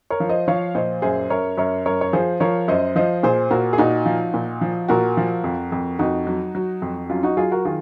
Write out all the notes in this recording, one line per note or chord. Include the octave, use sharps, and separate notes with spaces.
A#4 C#5
F3
C5 D#5
F3 C#5 F5
A#2 C5 D#5
F#2 G#4 C5
F#2 A#4 C#5
F#2 A#4 C#5
F#2 A#4 C#5
C#5
F3 G#4 C5
F3 A#4 C#5
F#2 C5 D#5
F3 C5 D#5
A#2 G#4 C5
A#2 F#4 A#4
G#4
A#2 D#4 F#4
F3
A#2
F3
A#2 F#4 A#4
F3
F2
F2
F2 D#4 F#4
F#3
F#3
F2
F#3 C#4 F4
D#4 F#4
F#3 F4 G#4
F#4 A#4
D#3 F4 G#4